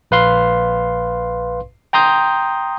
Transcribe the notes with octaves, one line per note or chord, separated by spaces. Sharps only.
A#1 B4 F5 C6
G5 A#5 C6 D#6 G6